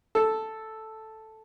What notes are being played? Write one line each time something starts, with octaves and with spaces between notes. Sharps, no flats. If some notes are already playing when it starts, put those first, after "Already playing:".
A4